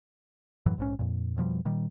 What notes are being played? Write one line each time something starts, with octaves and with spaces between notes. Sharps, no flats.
F#2 A2 E3 F#3
A#1 G#2 C#4
F2 A#2
F2 B2 F3 G3
A#2 D#3 G3